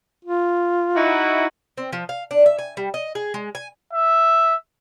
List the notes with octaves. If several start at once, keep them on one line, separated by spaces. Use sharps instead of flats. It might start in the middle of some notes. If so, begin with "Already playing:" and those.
F4
D#4 E4 F#4
C4
F3
F5
D4
E5
G#5
G3
D#5
G#4
G#3
G#5
E5